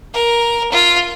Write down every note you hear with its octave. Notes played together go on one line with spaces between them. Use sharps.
A#4
F4